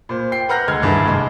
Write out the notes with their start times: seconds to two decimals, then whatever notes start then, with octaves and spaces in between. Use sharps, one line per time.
0.09 A#2 C5
0.32 G5 C7
0.49 B4 F#5 A#5 F6 G6 A#6
0.68 D2 G#3 F6 G#6
0.82 G#1 G2 E4 G#4
1.06 C2 G#3